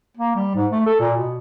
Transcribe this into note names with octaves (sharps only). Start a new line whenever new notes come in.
A#3
G3
G#2
A3
A4
A#2
B2